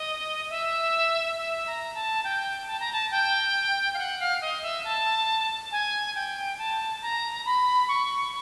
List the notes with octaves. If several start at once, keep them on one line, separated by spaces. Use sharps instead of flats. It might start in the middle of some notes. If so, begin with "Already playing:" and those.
Already playing: D#5
E5
E5
A#5
A5
G5
A5
A#5
A5
G5
F5
F#5
F5
D#5
E5
A5
G#5
G5
A5
A#5
B5
C#6